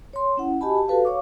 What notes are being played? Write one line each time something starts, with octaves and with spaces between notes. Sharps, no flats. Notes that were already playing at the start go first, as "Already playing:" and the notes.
C#5 C6
C#4 E4 F#5
F#4 G4 D#5 G#5 A5 B5
G4 A5
F#4 A4 B4 F5
C#5 F5 C#6 D6